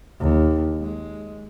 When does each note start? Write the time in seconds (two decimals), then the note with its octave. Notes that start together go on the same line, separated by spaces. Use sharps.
0.20 D#2
0.81 G#3